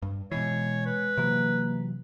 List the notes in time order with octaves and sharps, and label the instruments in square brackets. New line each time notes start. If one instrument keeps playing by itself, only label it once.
[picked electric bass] G2
[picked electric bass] B2 E3 [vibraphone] G#3 [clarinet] C#5
[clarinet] B4
[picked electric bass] C3 E3 F#3 [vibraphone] A#3